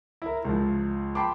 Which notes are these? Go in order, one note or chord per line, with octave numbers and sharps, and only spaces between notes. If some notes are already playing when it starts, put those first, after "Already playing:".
E4 A#4
C#2 F3
G5 A5 B5 C6 D6